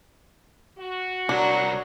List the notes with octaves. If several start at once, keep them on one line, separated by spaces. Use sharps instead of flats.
F#4
C2 F#3 D4 A#4